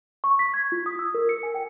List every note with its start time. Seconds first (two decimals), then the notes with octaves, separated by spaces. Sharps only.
0.24 C#6
0.39 B6
0.54 G#6
0.72 F4
0.86 D#6
0.99 E6
1.14 A#4
1.29 C#7
1.43 G#5
1.55 G5